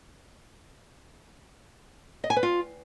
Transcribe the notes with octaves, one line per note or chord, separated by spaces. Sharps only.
D#5
G#5
B4
F4